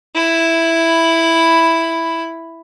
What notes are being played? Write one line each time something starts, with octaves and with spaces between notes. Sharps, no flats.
E4 B5